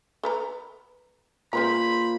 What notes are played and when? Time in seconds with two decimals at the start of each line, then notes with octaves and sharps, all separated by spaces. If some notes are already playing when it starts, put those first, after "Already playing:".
0.24 A4 B4 A#5
1.53 A#2 C#3 B4 C5 A#5 B5